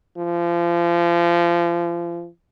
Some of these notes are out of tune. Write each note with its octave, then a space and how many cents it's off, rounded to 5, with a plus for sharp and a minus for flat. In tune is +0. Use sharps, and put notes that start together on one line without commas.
F3 -30